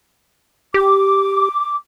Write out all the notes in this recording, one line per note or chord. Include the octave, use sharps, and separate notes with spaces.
G4 D6